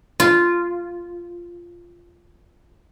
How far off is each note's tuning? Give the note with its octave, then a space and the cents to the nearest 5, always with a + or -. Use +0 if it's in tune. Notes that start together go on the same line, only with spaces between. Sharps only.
F4 -10